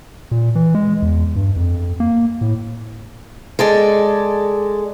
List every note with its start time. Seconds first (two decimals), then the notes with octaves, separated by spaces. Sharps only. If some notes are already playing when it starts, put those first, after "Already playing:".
0.31 A#2
0.55 E3
0.75 G#3
1.02 E2
1.36 G2
1.56 F2
2.00 A#3
2.41 A2
3.59 G#3 A4 D5